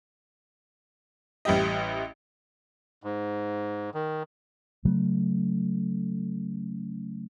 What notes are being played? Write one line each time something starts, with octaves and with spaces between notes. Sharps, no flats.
A1 G3 E4 G4 D#5
G#2
D#3
C#3 F#3 A3